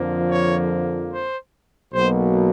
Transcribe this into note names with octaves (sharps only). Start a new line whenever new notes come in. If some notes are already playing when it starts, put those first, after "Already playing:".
Already playing: F2 D3 F3 A#3
C#5
C5
B1 B2 F#3 A#3 C5